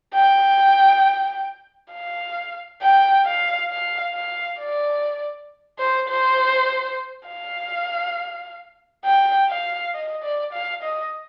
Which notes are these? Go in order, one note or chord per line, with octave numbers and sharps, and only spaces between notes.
G5
F5
G5
F5
F5
F5
D5
C5
C5
F5
G5
F5
D#5
D5
F5
D#5